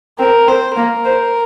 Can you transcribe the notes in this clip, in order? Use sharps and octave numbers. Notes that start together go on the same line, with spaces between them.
C4 A#4
C4 C5
A#3 A#4
C5